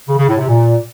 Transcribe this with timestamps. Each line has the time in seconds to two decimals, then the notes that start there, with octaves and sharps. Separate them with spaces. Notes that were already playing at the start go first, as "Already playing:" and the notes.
0.07 C#3
0.17 C#3
0.28 A2
0.38 C3
0.48 A#2